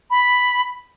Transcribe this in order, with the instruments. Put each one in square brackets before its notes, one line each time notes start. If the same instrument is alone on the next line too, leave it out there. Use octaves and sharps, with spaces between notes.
[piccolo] B5